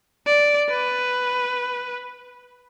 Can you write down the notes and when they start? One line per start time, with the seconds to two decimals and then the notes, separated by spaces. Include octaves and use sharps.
0.26 D5
0.70 B4